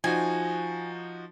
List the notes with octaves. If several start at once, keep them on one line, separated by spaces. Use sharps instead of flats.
F3 D#4 F#4 G#5